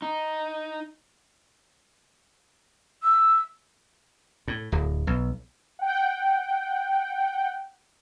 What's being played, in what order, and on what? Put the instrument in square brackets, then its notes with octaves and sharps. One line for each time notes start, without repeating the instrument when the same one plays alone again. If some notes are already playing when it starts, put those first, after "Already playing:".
[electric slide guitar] D#4
[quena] E6
[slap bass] A2
D1
B1
[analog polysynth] F#5 G5